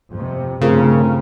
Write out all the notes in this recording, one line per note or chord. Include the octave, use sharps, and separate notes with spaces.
F2 C3
G2 C#3 A3 C4 F4 A#4